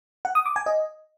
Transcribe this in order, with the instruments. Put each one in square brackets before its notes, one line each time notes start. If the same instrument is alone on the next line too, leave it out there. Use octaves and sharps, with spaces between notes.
[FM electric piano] F#5
D#6
D6
G#5
D#5